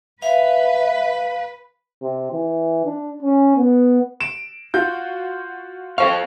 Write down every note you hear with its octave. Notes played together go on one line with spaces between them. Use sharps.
B4 E5 F5
C3
E3
D4
C#4
B3
D7 E7
F4 F#4 G6
A4 C5 F5 C#6